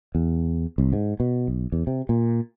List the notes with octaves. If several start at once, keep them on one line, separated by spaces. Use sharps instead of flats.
E2
C2
G#2
B2
B1
E2
C3
A#2